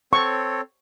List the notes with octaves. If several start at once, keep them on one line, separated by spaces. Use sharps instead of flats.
C4 A4 C#5 C#6